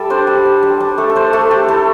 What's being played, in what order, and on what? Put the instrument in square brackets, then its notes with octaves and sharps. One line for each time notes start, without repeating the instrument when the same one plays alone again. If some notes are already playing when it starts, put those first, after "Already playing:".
Already playing: [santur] G3 A4 D5 E5
D4 C5
G3
D4
G3
D4
A3 A4
A4
D4 C5
A3 A4
D4 G4
E4 A4